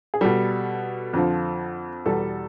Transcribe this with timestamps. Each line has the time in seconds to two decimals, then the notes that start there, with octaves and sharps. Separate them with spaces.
0.14 G#4
0.21 B2 G3 A4
1.13 F2 D3 F3
2.06 E2 B2 G3 A4